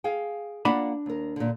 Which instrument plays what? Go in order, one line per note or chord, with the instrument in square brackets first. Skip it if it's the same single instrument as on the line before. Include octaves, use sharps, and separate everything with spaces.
[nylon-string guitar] G#4 F5 G5
[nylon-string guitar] A#3 F4 F#5 [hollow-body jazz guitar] D4 D5 B5
[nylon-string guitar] D#2 A#4
A#2 D3